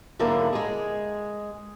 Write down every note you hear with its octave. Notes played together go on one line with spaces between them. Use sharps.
G#2 D3 F#3 A#3 E4
G#3 G#4